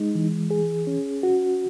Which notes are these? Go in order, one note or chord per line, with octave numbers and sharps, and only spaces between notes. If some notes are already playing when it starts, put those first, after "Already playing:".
Already playing: G#3 D#4
E3
G#4
C#4
F#4